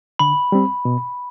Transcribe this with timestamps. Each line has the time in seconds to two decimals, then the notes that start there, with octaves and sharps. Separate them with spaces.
0.19 D3 B5
0.52 G3 C4
0.85 B2